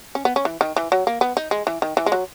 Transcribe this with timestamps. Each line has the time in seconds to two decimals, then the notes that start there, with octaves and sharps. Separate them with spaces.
0.15 C#4
0.25 B3
0.36 C#4
0.45 E3
0.61 D#3
0.76 E3
0.92 F#3
1.07 A#3
1.21 B3
1.37 D#4
1.51 G#3
1.67 E3
1.82 D#3
1.97 E3
2.06 G#3
2.12 F#3